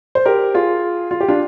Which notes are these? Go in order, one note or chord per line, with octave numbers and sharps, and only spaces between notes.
C5
G4 A#4
F4 G#4
F4
G4
D4 F4